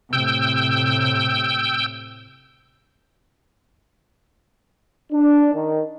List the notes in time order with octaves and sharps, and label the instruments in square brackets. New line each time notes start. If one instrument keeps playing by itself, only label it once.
[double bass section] A2 C3 [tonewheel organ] G5 E6 G6
[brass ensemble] D4
D#3